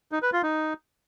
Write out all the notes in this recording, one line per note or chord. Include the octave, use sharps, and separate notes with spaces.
D#4
B4
F4
D#4